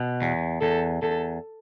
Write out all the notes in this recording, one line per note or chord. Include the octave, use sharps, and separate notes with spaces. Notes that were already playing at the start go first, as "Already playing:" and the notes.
Already playing: B2
E2
E2 A4
E2 A4